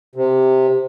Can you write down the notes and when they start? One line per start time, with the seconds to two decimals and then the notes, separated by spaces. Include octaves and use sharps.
0.16 C3